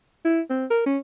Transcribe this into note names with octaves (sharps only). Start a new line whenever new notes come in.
E4
C4
A#4
C#4